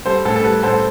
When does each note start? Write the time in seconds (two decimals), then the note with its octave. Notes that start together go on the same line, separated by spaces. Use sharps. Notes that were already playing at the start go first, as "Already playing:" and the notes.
0.05 G3 A4 C5
0.25 A2 A4
0.36 A4
0.44 G3 B4
0.63 A2 A4 C5